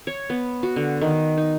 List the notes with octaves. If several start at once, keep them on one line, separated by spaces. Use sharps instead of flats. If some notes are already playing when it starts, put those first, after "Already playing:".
C#5
B3
F#4
D3
D#3
D#4